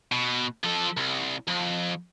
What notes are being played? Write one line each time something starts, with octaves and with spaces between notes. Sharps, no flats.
B2
F3 A4
C2
F2